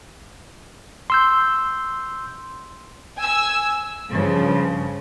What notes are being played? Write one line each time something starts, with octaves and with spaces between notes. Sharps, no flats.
C6 E6 G6
G#5 E6
G2 C#3 F3